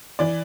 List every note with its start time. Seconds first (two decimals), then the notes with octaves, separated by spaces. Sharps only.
0.19 E3 D5